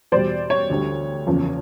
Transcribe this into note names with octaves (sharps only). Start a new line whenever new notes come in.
E2 B2 G3 C5 D5
C#5
D2 D3 G3
F#1 E2 C#3 F3